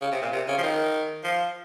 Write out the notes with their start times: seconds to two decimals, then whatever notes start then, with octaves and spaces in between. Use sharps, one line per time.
0.01 C#3
0.12 C3
0.22 A#2
0.32 C3
0.48 C#3
0.58 F3
0.63 D#3
1.23 F3